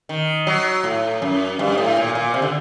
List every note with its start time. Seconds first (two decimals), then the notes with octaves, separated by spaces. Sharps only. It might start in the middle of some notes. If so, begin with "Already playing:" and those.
0.09 D#3
0.47 F#3
0.84 A2
1.22 F#2
1.59 G2
1.78 A2
1.97 A#2
2.15 A#2
2.34 C3
2.42 D3